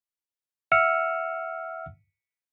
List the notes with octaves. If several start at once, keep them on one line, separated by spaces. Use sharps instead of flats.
E5 F#5 E6 F6 C#7